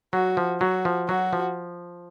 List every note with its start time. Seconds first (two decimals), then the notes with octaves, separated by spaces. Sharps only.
0.13 F#3 F#4
0.37 F3
0.61 F#3 F#4
0.85 F3
1.09 F#3 F#4
1.33 F3